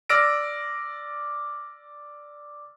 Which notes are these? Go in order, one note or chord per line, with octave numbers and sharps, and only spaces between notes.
D5 E6 F6 A#6 D7